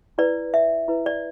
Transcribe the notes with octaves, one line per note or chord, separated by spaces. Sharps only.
E4 B4 D5
E5
E4 B4
D5